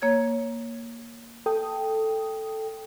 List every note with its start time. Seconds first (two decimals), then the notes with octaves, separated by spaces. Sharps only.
0.02 A#3 C#5 G#6
1.46 A4 G5 D#6